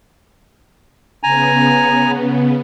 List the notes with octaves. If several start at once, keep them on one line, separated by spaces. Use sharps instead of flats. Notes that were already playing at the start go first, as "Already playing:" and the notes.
C#3 B3 G#5 A#5